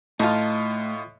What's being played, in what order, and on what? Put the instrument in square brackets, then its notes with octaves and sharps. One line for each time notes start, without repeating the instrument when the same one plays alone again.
[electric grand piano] A2 [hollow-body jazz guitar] A3 A5 [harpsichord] D#4 F4